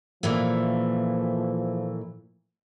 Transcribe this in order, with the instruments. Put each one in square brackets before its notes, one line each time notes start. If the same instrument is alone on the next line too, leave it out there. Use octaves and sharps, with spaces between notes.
[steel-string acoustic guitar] A#2 E3 A3 [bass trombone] F3